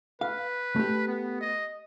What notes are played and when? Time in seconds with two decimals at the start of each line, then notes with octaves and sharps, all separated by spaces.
0.21 B4 F5
0.76 A3 G4
1.07 B3
1.41 D#5